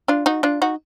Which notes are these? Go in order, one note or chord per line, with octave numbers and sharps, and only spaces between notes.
D4 F4
D#4 F#4
D4 F4
D#4 F#4